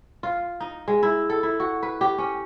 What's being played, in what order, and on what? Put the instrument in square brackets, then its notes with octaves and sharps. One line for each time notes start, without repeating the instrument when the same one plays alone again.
[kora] F4
D#4
G#3
E4
A4
E4
F#4
B4
G4
C#4